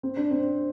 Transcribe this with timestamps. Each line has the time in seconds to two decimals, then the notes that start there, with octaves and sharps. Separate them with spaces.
0.03 C4
0.17 D4
0.31 C4